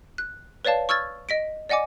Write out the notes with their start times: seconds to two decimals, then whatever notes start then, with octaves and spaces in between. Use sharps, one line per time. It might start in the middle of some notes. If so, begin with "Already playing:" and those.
0.18 F#6
0.65 B4 C#5 D5 F5 A5
0.89 C#6 E6 F6 G#6 A6
1.29 D#5 B6 D7
1.69 D5 D#5 F#5 G#5 D6